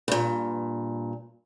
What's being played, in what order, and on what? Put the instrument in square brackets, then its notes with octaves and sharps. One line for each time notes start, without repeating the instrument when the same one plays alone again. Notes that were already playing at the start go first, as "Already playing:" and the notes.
[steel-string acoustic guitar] G2 A#2